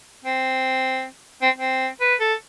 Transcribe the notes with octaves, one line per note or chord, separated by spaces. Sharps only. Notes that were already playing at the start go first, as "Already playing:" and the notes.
C4
C4
C4
B4
A4